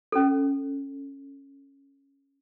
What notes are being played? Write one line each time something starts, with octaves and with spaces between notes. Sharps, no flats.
C#4 A4